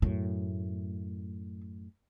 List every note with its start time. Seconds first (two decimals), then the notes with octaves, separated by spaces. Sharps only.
0.02 F#2 A2 A3